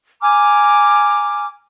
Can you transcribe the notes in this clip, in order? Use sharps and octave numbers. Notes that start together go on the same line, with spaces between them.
G#5 A#5 D6 F6